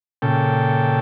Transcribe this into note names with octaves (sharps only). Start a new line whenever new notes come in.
A#2 C#3 A4 G5